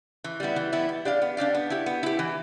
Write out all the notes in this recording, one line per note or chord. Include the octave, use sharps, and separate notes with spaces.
E3
G3 B3 E4
E3
G3 B3 E4
B3
D4 G4 D5 F5
B3
D4 G4 D5 F5
B3
E4 G4
B3
E4 G4
E3